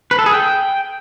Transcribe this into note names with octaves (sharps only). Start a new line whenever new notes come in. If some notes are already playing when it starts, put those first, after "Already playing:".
B4
A4
G#4
G5